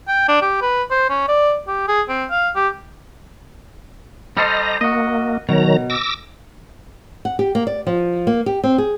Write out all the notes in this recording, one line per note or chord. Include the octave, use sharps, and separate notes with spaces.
G5
D4
G4
B4
C5
C#4
D5
G4
G#4
C4
F5
G4
G3 A4 C5 D#5 A#5
A#3 F#4 D#5
B2 D#3 F#3 A#5
D6 E6 A#6
F#5
G4
A#3
D5
F3
A#3
G4
C4
G#4